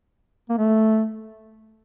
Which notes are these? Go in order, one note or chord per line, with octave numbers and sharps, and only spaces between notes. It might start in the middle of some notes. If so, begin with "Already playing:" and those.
A#3
A3